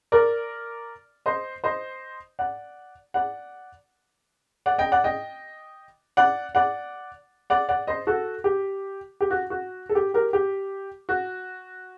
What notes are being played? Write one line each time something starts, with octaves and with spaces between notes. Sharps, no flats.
A#4 D5
C5 D#5
C5 D#5
D5 F#5
D5 F#5
D5 F#5
D#5 G5
D5 F#5
D#5 G5
D5 F#5
D5 F#5
D5 F#5
D5 F#5
C5 D#5
F#4 A4
G4
G4
F#4
F#4
A4
G4
G4 A#4
G4
F#4